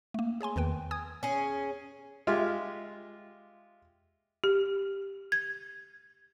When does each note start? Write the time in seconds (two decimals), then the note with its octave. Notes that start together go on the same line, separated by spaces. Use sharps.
0.14 A3 A#3
0.41 G#4 C#5 G#5 C6
0.56 E2 D#3 B4 G5
0.91 G#5 D#6 G#6
1.23 C#4 G#4
2.27 G#3 F4 G4 E5 F6
4.44 G4
5.32 G#6